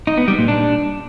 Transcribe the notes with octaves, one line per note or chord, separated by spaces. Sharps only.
D#4
B3
G3
A#2
D4